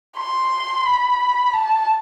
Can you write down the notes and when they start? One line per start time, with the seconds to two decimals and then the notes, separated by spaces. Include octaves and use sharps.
0.17 C6
0.86 B5
1.54 A5